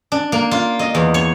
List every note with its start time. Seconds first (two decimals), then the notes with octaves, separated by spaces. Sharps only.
0.12 D4
0.32 A#3
0.51 F4
0.79 D#5
0.95 E2
1.14 C#5